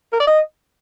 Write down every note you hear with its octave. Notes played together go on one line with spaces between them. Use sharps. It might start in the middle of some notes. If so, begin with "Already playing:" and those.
A#4
D5
D#5